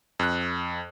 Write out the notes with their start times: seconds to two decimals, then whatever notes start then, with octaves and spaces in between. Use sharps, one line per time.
0.19 F2 F#6